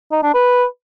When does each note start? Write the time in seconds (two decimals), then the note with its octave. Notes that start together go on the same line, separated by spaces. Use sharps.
0.11 D#4
0.23 D4
0.34 B4